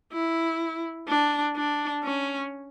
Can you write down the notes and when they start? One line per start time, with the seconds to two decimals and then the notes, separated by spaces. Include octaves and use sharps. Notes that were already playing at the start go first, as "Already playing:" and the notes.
0.13 E4
1.08 D4
1.56 D4
2.04 C#4